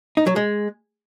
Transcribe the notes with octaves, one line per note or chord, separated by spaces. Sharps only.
D#4
F#3
G#3